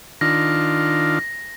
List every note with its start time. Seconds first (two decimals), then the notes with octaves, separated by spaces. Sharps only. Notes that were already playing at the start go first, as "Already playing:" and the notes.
0.21 D#3 D4 F4 A#6